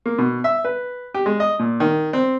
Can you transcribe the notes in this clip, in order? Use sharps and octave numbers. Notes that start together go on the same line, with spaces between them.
A#3
B2
E5
B4
G4
G#3
D#5
A#2
D#3
C4